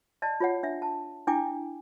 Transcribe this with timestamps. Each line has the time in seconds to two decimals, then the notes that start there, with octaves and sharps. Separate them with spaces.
0.22 D5 D#5 A5
0.40 F4 C#5 F#5
0.63 D4 E5
0.82 A5
1.27 D4 E4 G5 G#5 D6